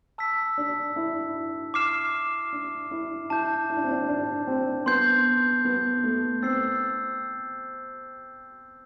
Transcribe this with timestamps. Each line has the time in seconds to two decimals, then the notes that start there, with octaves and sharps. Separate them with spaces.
0.18 A5 E6 B6
0.58 D4
0.96 E4
1.74 D6 F6 C7 E7
2.53 D4
2.91 E4
3.30 E4 A5 D6 G6
3.70 E4
3.76 D4
3.84 C4
3.91 D4
4.09 D4
4.47 C4
4.86 B3 C6 G6 C7
5.65 B3
6.04 A3
6.43 C4 E6 A6 C7